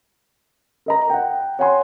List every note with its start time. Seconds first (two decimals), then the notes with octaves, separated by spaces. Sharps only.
0.86 A#4 D#5 A#5
1.10 F#5 G5
1.59 C#5 F#5 G#5 C6